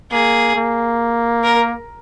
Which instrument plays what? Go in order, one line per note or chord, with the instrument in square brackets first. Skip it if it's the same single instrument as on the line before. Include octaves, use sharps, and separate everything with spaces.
[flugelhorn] A#3 [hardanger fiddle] G#4
[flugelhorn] A#3
[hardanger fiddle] A#4